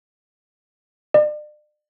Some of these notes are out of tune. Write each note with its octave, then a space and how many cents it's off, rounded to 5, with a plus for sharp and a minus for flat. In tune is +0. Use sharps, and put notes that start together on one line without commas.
D5 +40